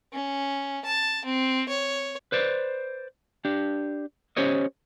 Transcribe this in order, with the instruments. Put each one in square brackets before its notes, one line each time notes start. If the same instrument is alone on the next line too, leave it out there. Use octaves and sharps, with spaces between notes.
[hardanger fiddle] C#4
A5
C4
C#5
[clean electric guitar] B4 C5 D5
D4 G4
C#4 G4 C5 C#5 D#5